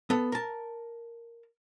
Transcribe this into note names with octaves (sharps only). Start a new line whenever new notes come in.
B3 A4
A#4 A5